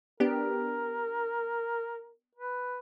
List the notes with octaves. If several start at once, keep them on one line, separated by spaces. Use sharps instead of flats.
B3 D4 G4 A#4
B4